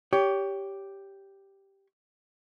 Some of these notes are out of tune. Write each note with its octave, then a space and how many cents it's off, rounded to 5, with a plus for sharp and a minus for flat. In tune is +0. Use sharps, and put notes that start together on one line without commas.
G4 +0 C#5 +20